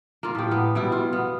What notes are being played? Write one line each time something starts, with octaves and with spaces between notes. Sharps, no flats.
A#3 F4
A2 G4
B3
B2 G3 E4
F4
B3